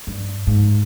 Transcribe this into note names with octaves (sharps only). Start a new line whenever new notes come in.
G2
G#2